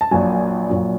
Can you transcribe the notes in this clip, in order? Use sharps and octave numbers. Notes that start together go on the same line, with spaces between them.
A5
A#1 A#2 F#3 G#5
A#1 A#2 F#3